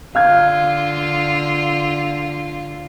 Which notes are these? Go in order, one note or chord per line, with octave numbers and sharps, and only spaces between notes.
D3 F4 F5 F6 G#6